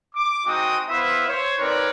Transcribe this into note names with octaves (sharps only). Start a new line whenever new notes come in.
D6
G#3 C4 D#4 F#4 G5 D#6
B3 E4 B4 C5 E5 F5
C5 C#5
C4 D#4 A#4 B4 C#5 D5